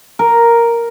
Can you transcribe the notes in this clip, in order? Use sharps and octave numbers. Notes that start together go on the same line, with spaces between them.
A#4